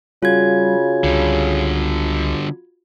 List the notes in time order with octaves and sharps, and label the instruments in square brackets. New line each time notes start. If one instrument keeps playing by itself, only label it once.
[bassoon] C#3 [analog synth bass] G3 [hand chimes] F4 F#4 G#6
[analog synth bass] C#2 [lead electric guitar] D3 G3